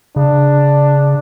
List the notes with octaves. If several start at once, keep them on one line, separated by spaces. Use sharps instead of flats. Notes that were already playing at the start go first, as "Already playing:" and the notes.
C#3 D4